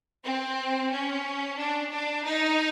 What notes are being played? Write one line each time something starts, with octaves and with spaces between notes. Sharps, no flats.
C4
C#4
D4
D4
D#4